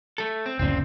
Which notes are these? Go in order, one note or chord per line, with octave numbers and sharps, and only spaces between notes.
A3 A4
C4
F#1 D2 A#2 C4 C#4